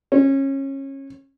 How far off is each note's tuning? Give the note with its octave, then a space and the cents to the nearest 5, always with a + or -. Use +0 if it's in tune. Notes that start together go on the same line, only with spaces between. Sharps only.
C#4 -25